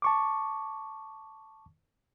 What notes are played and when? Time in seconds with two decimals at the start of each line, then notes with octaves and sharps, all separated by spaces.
0.02 A5 C#6 D6